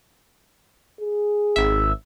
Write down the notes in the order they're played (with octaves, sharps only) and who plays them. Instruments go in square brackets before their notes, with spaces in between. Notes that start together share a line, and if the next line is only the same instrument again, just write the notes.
[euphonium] G#4
[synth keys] G#1 E5